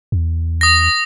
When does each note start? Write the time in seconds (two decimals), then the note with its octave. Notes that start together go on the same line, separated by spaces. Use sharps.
0.12 E2
0.61 D#6 A#6